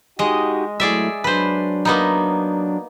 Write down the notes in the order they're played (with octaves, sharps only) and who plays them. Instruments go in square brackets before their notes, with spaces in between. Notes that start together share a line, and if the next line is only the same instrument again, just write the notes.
[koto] G#3 D#5 [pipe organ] D#4 F#4 G4
[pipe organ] F#3 A3 E4 [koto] G#4 D5 E5
[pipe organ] F#3 D4 [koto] B4 C5
[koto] A#3 B3 D#4